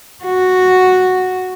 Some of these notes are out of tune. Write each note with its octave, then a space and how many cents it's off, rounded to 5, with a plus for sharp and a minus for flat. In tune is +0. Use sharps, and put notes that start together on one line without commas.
F#4 -5